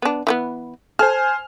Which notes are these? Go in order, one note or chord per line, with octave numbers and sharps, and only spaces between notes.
B3 D4
E3 F3 B3
A4 C5 G#5 F6